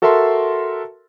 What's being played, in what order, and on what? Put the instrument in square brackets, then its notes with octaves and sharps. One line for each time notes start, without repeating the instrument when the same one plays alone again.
[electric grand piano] F#4 A4 A#4 E5 A5 C6